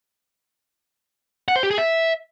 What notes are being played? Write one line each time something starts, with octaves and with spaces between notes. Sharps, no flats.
F#5
C5
G4
G#4
E5